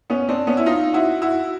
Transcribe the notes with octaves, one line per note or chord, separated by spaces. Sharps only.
B3 C#4
C4 D4
B3 C#4
E4
D#4 F4
E4 F#4
E4 F#4